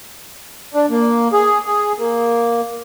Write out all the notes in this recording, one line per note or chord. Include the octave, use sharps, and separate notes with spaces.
D4
A#3
G#4
G#4
A#3